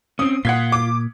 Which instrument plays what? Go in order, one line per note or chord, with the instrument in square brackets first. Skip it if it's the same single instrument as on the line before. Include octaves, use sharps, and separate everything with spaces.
[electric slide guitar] C4 C#4 [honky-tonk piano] D#6
[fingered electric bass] A#2 [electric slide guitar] F4 [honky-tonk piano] F#5 G#6 B6
[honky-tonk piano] D6